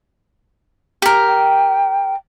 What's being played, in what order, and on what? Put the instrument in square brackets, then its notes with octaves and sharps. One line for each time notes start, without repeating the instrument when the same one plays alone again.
[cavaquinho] G4 A#4
[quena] G5